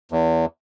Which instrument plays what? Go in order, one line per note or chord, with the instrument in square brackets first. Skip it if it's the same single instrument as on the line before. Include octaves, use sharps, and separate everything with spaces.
[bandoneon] E2